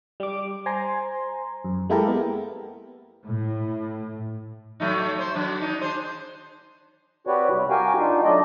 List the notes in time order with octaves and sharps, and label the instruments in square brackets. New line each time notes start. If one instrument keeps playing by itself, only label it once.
[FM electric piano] G3 D6
C5 G#5 A#5 C6
F#2
G#3 A#3 E4 G4 A4 A#4
B3
[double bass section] A2
[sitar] F#3 A3 D#4
C5
F#3 D4
D4 D#4
D4 G#4 C5
[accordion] C4 F#4 G4 B4 C#5 D5
C3 G3
F#4 G4 A#4 F5 G5 G#5
D4 D#4 F4
F#3 A3 D4 D5 D#5